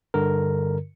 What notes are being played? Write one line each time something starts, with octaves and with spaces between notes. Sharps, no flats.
G2 D3 A#4